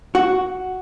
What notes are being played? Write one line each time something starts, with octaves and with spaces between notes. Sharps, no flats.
F#4